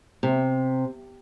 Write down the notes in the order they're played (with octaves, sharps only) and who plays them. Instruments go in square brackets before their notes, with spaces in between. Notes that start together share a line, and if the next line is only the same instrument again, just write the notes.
[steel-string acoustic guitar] C3